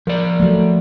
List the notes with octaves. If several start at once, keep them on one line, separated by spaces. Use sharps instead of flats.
F3 A#4 D5
F#3 A3